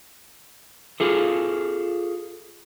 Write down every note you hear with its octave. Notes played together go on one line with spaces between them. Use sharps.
F4 G#4 A4